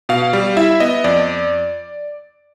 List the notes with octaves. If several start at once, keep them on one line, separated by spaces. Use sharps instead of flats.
B2 F5
G3
E4 E5
B3 D#5
F2 D5